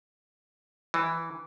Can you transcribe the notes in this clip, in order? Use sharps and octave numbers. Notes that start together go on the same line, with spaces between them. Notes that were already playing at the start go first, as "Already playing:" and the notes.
E3